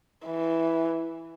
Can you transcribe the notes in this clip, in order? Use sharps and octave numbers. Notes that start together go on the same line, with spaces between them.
E3